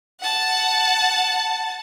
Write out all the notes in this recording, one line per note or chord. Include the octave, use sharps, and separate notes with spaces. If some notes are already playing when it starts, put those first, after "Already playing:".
F#5 A5